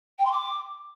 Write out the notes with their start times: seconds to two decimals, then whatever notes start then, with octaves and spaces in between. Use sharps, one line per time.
0.18 G5
0.25 C6
0.32 D6